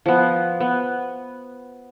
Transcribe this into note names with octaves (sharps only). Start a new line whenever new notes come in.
F3 B3
B3